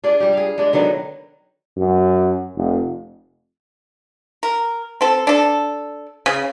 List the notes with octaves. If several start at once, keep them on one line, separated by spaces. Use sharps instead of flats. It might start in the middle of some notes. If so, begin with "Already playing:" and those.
D4 F4 G#4 D5
G3 G4
G#4 F5
G#3 D4
D3 D#3 F#3 B3
F#2
F1
A#4
C4 A4
D4 A4
C#3